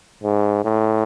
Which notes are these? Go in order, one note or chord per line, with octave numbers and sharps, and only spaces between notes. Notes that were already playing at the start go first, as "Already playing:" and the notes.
G#2
A2